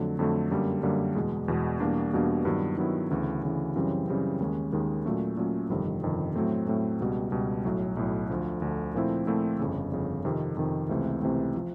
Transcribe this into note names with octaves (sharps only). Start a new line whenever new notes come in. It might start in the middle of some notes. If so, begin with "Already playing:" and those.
Already playing: F2 D3 F#3 A3
F2 D3 F#3 A3
F#2 D3 G3 A#3
F#2 D3 G3 A#3
E2 B2 G#3
E2 B2 G#3
E2 B2 G3 A#3 D4
E2 B2 G3 A#3 D4
G2 D#3 F#3 B3 E4
G2 D#3 F#3 B3 E4
D2 C#3 E3
D2 C#3 E3
F#2 C#3 E3 G3 C4
F#2 C#3 E3 G3 C4
D#2 D#3 G#3 C#4
D#2 D#3 G#3 C#4
A#2 F#3 A3 C#4
A#2 F#3 A3 C#4
G1 F2 C3 D#3 G3
G1 F2 C3 D#3 G3
A2 F#3 A3 C4
A2 F#3 A3 C4
C#2 B2 G3
C#2 B2 G3
B1 A2 F#3
B1 A2 F#3
D2 D3 F3
D2 D3 F3
A#2 F3 A3 C4 E4
A#2 F3 A3 C4 E4
G1 F2 C#3
G1 F2 C#3
F2 C3 D#3
F2 C3 D#3
C#2 C3 E3 A3 C4
C#2 C3 E3 A3 C4
F3